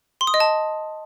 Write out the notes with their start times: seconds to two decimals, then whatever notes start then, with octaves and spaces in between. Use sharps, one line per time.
0.21 C6
0.27 D#6
0.34 D#5
0.40 A5